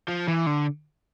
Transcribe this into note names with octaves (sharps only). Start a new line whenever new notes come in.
F3
E3
D3